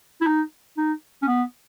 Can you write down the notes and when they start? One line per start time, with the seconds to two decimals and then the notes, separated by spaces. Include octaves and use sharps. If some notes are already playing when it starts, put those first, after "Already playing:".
0.21 E4
0.27 D#4
0.78 D#4
1.22 C#4
1.27 B3